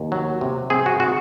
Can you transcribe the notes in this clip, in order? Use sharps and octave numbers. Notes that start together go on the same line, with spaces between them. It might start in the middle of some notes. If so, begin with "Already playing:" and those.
Already playing: D#2
F#3
C3
C4 G#4
F#4
F#4